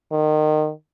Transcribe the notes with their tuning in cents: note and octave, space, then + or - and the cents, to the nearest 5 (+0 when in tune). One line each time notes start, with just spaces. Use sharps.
D#3 -25